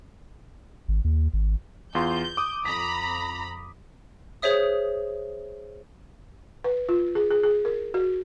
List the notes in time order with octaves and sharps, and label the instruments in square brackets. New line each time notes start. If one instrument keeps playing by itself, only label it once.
[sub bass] G#1
D#2
G#1
[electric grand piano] E2 F4 C6 [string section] G6
[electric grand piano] D6 D#6
[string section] F2 A#5 B5 [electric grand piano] B6
[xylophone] G#4 C5 C#5 E5 D#6
[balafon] B4
F4
G#4
G#4
G#4
A#4
F#4